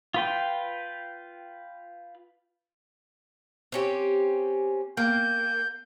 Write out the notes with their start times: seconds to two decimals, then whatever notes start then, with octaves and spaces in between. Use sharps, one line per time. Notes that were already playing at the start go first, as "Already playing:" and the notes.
0.14 F4 B4 G5
3.72 C4 C#4 G4
4.97 A#3 G5 G6